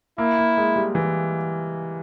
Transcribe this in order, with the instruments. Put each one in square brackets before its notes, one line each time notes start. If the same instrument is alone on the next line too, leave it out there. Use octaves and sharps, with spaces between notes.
[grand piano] A#3 [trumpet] E4
[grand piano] A#3
G#3
G3
E3